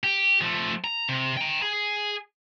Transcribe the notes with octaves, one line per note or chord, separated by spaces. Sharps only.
G4
F3 A3
A#5
C3
G5 A#5
G#4 G#5